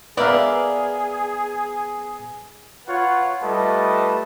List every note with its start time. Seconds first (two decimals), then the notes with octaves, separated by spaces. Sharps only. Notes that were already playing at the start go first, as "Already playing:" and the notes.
0.17 B3 G#4 A#4 B4 D5 E5 F5
2.87 F4 B4 C#5 F#5
3.42 G3 A3 F4 B4 D#5 A5